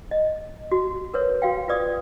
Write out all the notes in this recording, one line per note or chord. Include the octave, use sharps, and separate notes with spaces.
D#5
F#4
A#4 B4 C#5
F#4 F5 G5
F4 B4 D5 D#6